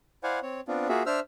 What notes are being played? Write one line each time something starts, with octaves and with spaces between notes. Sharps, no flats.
E4 C5 D5 F5 F#5 G#5
C4 C#5
B3 C4 D4 F4
A#3 F4 F#4 G#4 E5
D4 C5 E5 E6 F6